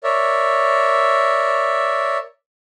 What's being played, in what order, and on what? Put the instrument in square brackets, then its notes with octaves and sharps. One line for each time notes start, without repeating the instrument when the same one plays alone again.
[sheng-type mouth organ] A#4 C#5 D5 E5